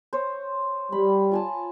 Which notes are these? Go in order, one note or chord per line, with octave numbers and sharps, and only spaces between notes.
C5 C#5
G3 B5
F4 G#5 A5